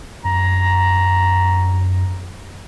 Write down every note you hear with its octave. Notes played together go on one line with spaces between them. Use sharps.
F#2 A#5